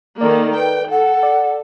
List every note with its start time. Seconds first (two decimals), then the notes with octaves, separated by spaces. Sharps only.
0.21 D#3 A#3 A4 D5
0.56 B4 G5
0.91 A4 F#5
1.23 D5